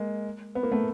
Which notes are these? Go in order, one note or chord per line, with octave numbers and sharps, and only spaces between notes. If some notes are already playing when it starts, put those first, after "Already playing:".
Already playing: G#3 A#3
B3
A#3
A3 B3